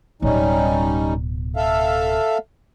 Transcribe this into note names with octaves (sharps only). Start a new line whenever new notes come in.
D1 B2 G3 C#4 D#4
A4 E5 F5